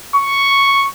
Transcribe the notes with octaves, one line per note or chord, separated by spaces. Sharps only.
C#6